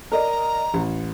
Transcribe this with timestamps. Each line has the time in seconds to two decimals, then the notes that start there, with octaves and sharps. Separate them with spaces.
0.12 A#4 D5 D#5 A#5
0.74 A1